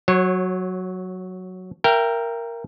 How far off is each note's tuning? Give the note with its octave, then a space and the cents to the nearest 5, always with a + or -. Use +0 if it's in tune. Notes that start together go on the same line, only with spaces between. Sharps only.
F#3 +0 C#5 -25
A#4 +0 E5 +40 G5 +0